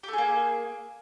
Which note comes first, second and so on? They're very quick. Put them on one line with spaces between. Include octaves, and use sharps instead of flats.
G4 A3 G#4 A#3